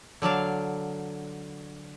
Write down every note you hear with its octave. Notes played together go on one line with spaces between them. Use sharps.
D3 F#3 D4 F5